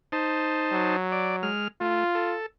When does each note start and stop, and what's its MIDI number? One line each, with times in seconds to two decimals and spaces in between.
0.12 0.96 63
0.12 0.96 72
0.12 0.96 81
0.72 1.49 54
1.12 1.36 74
1.43 1.68 56
1.43 1.68 89
1.81 2.04 57
1.81 2.36 65
2.15 2.46 69